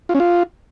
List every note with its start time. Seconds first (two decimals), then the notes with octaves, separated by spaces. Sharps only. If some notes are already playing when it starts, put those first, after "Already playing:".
0.09 F4
0.15 C#4
0.20 F4